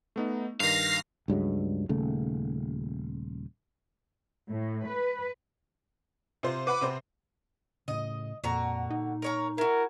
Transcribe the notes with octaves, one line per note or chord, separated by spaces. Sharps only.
A3 B3 D#4
G2 D#3 F5 A#6 C7
C#2 G2 F#3 G#3
D#1 C#3 A3
A2
B4
C3 F4 C5
B4 F#5 B5 D6
C3 C4 C5
A2 C#3 D#5
F2 A#2 D3 F#4 A#5
D#4
A#4 C#5 A#5
E4 F#4 A#4